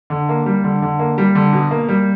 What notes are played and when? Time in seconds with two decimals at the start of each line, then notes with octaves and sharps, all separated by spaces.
0.10 D3
0.29 A#3
0.46 G3
0.64 D3
0.82 D3
0.99 A#3
1.18 G3
1.35 D3
1.53 B2
1.71 A#3
1.89 G3